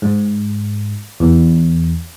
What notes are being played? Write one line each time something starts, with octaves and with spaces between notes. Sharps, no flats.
G#2
E2